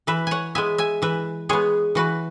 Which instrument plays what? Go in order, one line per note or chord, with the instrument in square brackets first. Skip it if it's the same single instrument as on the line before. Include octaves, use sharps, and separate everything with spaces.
[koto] E3 B4 E5
C#5 F#5 G#5
G#3 B3 E5 G#5
E5 G#5
E3 B4 E5
G#3 B3 G#4 C#5
E3 F#4 B4